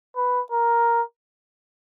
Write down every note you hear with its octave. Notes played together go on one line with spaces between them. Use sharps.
B4
A#4